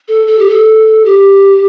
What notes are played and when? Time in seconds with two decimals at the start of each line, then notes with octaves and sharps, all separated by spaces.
0.08 A4
0.28 A4
0.39 G4
0.49 A4
1.05 G4